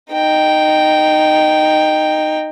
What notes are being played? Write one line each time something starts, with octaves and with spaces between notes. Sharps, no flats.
D#4 G5